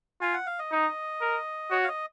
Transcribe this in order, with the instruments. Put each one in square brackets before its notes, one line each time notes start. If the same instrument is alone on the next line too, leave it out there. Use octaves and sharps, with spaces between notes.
[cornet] F4 [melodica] G#5
[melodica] F#5
F5
D#5
[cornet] D#4
A#4
[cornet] F#4 [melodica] C#5
[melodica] F5
D#5